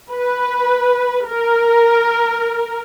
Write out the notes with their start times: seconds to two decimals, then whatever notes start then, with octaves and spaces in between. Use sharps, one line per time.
0.12 B4
1.28 A#4